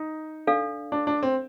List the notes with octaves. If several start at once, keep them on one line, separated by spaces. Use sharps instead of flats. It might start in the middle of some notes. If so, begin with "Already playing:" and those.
Already playing: D#4
D4 A4 D5 F5
D4
D4
C4